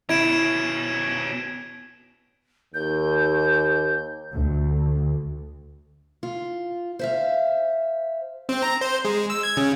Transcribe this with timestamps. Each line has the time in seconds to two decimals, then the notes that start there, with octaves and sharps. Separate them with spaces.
0.09 B2 C#4 E4 G#6 D7 E7
2.74 D#2 G6
4.33 D2
6.23 F4
6.99 C5 E5 F5
8.49 C4
8.63 A#5
8.81 C5
9.05 G#3
9.30 E6
9.43 G#6
9.57 C#3